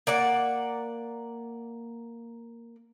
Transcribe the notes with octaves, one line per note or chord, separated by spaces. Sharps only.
A#3 D5 F#5